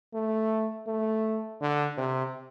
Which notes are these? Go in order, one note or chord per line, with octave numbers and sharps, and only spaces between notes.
A3
A3
D3
C3